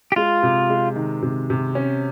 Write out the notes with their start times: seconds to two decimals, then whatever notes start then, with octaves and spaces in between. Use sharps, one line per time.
0.12 G4
0.16 G#3 F4
0.43 C3
0.70 G#3
0.96 D#3
1.22 C3
1.50 C3
1.75 C#4